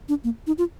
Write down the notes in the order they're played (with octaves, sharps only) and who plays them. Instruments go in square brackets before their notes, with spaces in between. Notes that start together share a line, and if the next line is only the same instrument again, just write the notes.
[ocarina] D4
A#3
D#4
F4